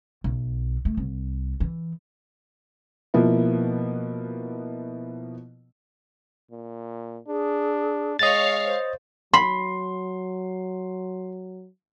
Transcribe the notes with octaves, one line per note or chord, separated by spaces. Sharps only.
B1
A3
C2
E3
B2 F3 A#3 B3 E4
A#2
D4 G#4
G#3 C#5 D#5 F5 A6
C5
F#3 B5 C6